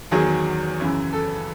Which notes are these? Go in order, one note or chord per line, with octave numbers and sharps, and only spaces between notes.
E2 D#3 F#3 G#4
F#2 C#3 E3
A4